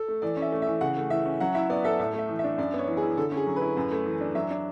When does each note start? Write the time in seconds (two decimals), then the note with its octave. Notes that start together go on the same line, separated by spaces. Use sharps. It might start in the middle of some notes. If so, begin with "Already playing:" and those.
Already playing: A4
0.08 A3
0.22 E3 D5
0.37 C#4
0.42 E5
0.52 A3
0.62 E5
0.67 E3
0.81 C#3 F#5
0.97 A3
1.10 E3 E5
1.26 C#4
1.40 F#3 F#5
1.55 E4 E5
1.70 B3 D5
1.84 A4 E5
2.00 A2 E5
2.14 A3 E5
2.29 E3
2.39 E5
2.44 D4
2.58 F#2 D5
2.74 B3 C#5
2.88 E3
2.97 G#4
3.03 E4
3.17 D3 A4
3.32 C#4
3.37 G#4
3.47 F#3
3.56 B4
3.62 E4
3.77 F#2
3.92 A3
4.06 E3
4.21 D4
4.35 F#3 E5
4.51 D4